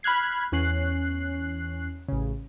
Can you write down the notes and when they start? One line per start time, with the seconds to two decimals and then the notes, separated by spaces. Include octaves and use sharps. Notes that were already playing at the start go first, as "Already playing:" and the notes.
0.03 B5 F6 F#6 G#6 C7
0.52 E2 C#4 F#6 C7
2.08 A1 C#3